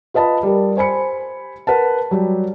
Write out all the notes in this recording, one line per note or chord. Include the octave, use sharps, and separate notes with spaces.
F4 B4 D#5 A5 B5
G3 A#4
C5 G#5 B5 C#7
A#4 B4 F#5 A5
F#3 G3 G4